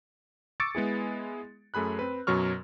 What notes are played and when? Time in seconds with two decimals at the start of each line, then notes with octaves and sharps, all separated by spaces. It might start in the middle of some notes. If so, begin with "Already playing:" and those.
0.60 C#6 D6 E6 A6 C#7 D7
0.75 G#3 B3 E4 G#4
1.74 F#2 A3 G#4 B5 F#6
1.99 C4 B4
2.27 F#2 B2 F#3 C#6 F6